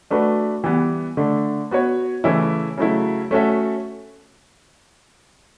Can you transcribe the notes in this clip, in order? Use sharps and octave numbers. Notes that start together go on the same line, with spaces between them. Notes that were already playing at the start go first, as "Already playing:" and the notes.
A3 D4 F#4 B4
E3 G3 B3
D3 A3 D4
B3 F#4 C#5
C#3 E3 A3 C#4 E4
C#3 F#3 A3 E4
A3 C#4 F#4 A4 E5